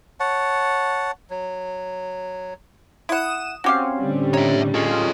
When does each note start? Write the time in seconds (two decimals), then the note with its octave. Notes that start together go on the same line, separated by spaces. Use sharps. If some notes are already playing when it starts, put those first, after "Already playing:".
0.20 C#5 F#5 A5
1.30 F#3
3.09 E4 F#5 D#6 E7
3.64 C4 C#4 F#4 G4 F5
4.00 A2 D3 G3
4.34 D#4 C#5 E5
4.74 C#4 F4 G#4 A4 D#5